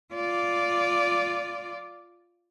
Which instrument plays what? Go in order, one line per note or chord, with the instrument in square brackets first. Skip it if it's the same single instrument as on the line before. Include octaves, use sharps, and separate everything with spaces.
[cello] F4 D5